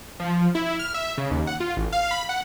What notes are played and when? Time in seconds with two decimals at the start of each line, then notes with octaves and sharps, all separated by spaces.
0.20 F3
0.55 E4
0.79 F6
0.94 E5
1.18 C#3
1.31 D#2
1.47 F#5
1.60 F4
1.77 A1
1.92 F5
2.11 B5
2.29 F#5